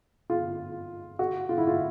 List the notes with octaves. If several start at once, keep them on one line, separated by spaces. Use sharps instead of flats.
F4
F#4
F4
E4
F4